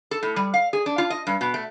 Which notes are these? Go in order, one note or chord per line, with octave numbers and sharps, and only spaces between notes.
A4
A2
G3
F5
G#4
D4
F4
D#5
G2
B2
A3